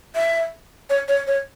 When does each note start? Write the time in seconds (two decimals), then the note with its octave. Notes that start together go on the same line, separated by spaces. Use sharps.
0.16 E5
0.90 C#5
1.08 C#5
1.27 C#5